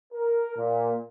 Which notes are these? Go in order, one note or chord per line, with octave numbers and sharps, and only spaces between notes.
A#4
A#2